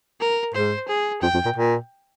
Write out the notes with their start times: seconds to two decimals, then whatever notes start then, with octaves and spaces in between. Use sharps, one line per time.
0.20 A#4
0.54 G#2 C5
0.88 G#4
1.22 F2 G5
1.34 F2
1.45 A#2
1.56 A#2